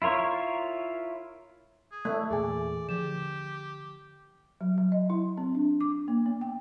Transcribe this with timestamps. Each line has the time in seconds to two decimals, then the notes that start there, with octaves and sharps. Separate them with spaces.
0.02 E4 F4 A#4 C#5
1.91 G#4
2.05 A3
2.30 E2 A#2 G#4 D5 G#5
2.89 D3 F3 G4 E7
4.61 F#3
4.78 F#3
4.92 D#5
5.10 E4
5.38 C4
5.55 D4
5.81 D6
6.08 A#3
6.26 B3
6.41 G5